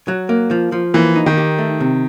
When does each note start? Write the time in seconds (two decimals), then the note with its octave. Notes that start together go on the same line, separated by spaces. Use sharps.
0.08 F#3
0.29 A#3
0.51 F3
0.72 F3
0.94 E3 A#3
1.16 D#4
1.26 D#3
1.37 G4
1.58 A3
1.80 C3